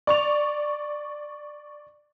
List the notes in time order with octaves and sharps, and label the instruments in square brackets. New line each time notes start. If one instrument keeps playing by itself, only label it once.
[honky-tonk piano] D5 C#6 F7